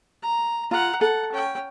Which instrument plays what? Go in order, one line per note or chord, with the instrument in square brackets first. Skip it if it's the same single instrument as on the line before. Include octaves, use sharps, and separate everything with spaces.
[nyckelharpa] A#5
[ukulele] F4 [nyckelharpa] F#5 A#5
[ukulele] A4 [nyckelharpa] F#5
[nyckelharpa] C#4 G5